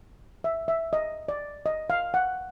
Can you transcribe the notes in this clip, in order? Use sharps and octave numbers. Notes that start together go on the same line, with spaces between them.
E5
E5
D#5
D5
D#5
F5
F#5